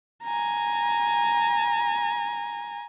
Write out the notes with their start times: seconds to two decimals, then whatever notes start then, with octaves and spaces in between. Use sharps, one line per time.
0.24 G#5 A#5